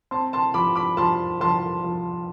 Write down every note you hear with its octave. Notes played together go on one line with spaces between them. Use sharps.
C4 A5 C6
A5 C6
F3 B5 D6
B5 D6
F3 A5 C6
F3 A5 C6
F3